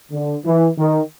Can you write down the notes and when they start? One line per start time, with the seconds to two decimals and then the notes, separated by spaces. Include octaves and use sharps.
0.12 D3
0.45 E3
0.77 D#3